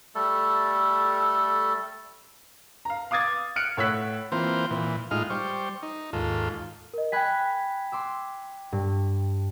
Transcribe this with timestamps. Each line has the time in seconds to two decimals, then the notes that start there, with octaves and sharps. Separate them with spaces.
0.15 G3 A3 A4
2.85 F5 A#5
3.11 F5 D6 D#6 G#6 A6
3.56 F6 F#6 C#7 D7
3.77 A2 C#5 F#5 E6 F#6 B6
4.32 E3 A#3 C4 F4 C5
4.71 A#2 E3
5.11 A2 G#3 D#4 F4 F6
5.30 G3 C5 C#6
5.83 D#4
6.13 D#2 G#2 F4 A4
6.94 A#4 D#5
7.12 G5 G#5 B5 F#6 G#6 B6
7.92 C6 D6 E6
8.72 G2